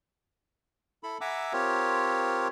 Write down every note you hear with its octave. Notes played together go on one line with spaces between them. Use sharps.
E4 A4 B5
E5 F#5 G#5 A#5 D6 E6
C4 F4 G4 A#4 C#5